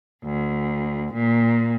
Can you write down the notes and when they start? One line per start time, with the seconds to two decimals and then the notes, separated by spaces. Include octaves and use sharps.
0.23 D2
1.14 A#2